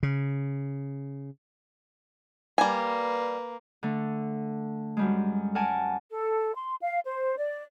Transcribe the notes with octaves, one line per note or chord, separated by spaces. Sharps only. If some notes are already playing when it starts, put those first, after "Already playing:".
C#3
G3 A#3 B4 G#5
D3 A3
F#2 G3 G#3
A#4 D5 F#5 G#5 A5
A4
C6
F5
C5
D5